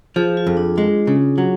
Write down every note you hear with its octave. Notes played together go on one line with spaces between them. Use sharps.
F3 G#4
F4
F2
D4
G#3
C#3
F#3